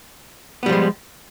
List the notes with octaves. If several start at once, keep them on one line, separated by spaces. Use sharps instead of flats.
F3 G3 G#3 B3